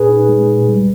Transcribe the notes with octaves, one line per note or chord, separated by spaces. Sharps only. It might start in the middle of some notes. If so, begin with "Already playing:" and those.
Already playing: A#2 C#4 G#4 B4
D#4
G#3
A#2
G3